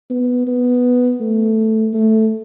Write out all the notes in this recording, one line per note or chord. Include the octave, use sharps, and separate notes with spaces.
B3
B3
A3
A3